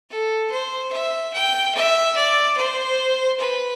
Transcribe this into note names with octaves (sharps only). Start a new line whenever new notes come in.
A4
C5
E5
G5
E5
D5
C5
B4